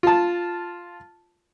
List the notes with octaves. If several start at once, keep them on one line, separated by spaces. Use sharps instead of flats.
F4 A5